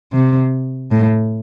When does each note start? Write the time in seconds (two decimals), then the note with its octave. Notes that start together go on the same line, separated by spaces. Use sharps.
0.13 C3
0.91 A2